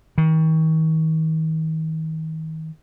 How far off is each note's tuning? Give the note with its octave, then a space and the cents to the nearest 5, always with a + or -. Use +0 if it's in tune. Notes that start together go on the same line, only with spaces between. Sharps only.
D#3 +40